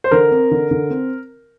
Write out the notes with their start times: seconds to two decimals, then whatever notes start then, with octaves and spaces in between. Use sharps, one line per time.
0.04 C5
0.11 D3 A#4
0.31 C4
0.51 D3
0.71 D3
0.90 C4